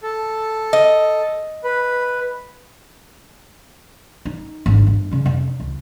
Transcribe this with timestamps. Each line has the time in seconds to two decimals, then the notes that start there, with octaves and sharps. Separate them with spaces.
0.03 A4
0.73 D#5
1.64 B4
4.25 D#4
4.66 G#1 D2
4.87 G1
5.11 C#3 C#4
5.26 F1
5.60 C#2